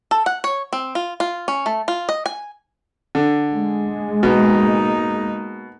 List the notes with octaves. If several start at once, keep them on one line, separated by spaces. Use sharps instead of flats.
A4
F#5
C#5
C4
F4
F4
C#4
A3
F4
D#5
G#5
D3
G#3
B2 A#3 D#4